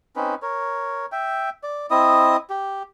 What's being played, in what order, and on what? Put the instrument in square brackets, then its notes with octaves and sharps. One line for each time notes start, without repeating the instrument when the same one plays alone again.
[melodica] C4 C#4 D#4 B4
A#4 C#5
E5 G5
D5
C4 E4 D#5 D#6
G4